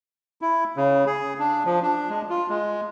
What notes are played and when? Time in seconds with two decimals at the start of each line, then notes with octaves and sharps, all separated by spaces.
0.41 E4
0.76 C#3
1.06 G#4
1.39 D4
1.65 F3
1.83 D4
2.09 G#3
2.30 F4
2.49 G#3